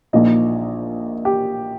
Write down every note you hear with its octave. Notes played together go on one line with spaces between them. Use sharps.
A#1 A#2 F3 D#4 D#5
G4